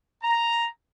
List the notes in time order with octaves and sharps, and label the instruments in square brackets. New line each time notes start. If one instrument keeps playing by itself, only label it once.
[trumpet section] A#5